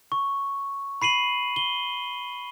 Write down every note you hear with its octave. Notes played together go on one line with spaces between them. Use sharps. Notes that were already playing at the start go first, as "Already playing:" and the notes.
C#6
B5 C7 D#7 F#7
G7